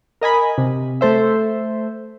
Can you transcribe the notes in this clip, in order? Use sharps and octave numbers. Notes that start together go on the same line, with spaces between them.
A#4 D#5 G#5 B5
C3
A3 A4 C5 E5